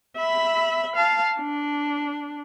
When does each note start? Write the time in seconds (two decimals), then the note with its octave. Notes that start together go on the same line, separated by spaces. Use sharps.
0.17 E5 B5
0.95 F5 A5
1.40 D4